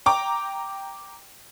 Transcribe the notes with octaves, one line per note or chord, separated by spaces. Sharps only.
G5 A#5 D6